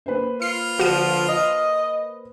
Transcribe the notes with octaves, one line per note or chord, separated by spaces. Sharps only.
A#3 B4 C5
F4 C7
D3 F3 F#4 D#7
D#5